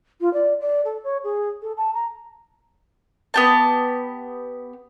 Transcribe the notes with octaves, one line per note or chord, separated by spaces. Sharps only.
F4
D5
D5
A4
C#5
G#4
A4
A5
A#5
B3 G4 A5